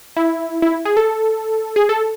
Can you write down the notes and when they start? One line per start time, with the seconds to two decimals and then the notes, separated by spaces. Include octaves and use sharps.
0.16 E4
0.62 E4
0.85 G#4
0.97 A4
1.76 G#4
1.89 A4